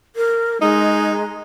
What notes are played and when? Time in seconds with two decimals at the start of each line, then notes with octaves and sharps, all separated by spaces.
0.16 A#4
0.61 G#3 D#4